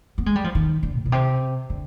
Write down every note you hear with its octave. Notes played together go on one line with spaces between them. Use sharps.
B3
G#3
G3
F3
D#3
D3
G#2
B2
C3
D3